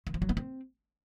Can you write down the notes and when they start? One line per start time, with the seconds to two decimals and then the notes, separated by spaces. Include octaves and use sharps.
0.07 D#3
0.14 F3
0.22 F#3
0.29 B3
0.37 C4